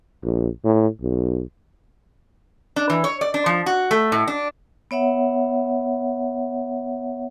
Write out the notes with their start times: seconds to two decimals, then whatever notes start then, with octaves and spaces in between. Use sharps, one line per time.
0.23 A#1
0.64 A2
1.01 B1
2.76 D4
2.90 E3
3.04 C#5
3.21 D5
3.34 D4
3.46 F3
3.66 F#4
3.91 A3
4.12 A2
4.28 D4
4.91 B3 C#5 E5 F#5